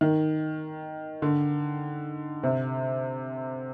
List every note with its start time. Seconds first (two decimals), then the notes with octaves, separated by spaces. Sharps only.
0.01 D#3
1.22 D3
2.43 C3